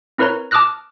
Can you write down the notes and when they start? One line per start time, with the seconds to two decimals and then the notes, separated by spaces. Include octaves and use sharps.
0.18 C4 E4 A#4 B4 C#5 A#5
0.51 A5 D6 D#6 F6 F#6 A#6